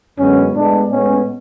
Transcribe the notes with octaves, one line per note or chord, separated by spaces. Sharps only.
F#2 D3 G#3 B3 C#4
A2 G#3 B3 D4
A2 G#3 B3 C#4